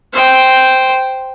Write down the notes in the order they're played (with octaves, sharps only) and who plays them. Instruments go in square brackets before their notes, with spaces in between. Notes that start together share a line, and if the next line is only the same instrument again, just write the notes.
[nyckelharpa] C5 G5